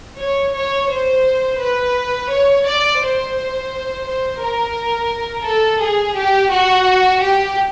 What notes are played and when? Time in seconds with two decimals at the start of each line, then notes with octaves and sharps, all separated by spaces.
0.18 C#5
0.54 C#5
0.89 C5
1.59 B4
2.29 C#5
2.65 D5
3.00 C5
4.05 C5
4.40 A#4
5.45 A4
5.81 G#4
6.16 G4
6.51 F#4
7.22 G4